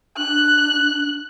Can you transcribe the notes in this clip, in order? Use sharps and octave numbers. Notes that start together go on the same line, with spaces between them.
D4 F#6